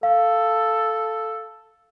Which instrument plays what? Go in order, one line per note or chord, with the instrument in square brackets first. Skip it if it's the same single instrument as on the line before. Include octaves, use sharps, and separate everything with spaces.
[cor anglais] A4 [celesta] F5